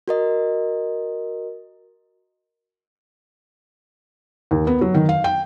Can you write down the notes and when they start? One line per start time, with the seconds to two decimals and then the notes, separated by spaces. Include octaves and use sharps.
0.08 F#4 A#4 D#5
4.51 D#2
4.67 B3
4.81 F#3
4.94 D#3
5.09 F5
5.24 G5